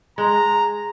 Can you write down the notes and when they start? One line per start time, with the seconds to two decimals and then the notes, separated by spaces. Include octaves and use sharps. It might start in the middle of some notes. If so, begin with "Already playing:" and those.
0.18 G#3 A#5